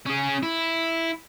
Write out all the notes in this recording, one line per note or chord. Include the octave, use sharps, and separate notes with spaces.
C#4 G#4
E4